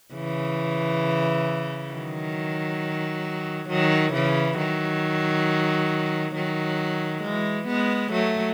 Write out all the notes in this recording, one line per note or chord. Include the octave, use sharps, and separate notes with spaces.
C#3 E3
D#3 F#3
D#3 F#3
C#3 E3
D#3 F#3
D#3 F#3
E3 G#3
G#3 B3
F#3 A3